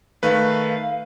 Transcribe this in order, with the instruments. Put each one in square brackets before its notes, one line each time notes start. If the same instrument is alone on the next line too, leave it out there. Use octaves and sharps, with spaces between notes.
[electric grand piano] D#3 A3 B4 [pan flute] F5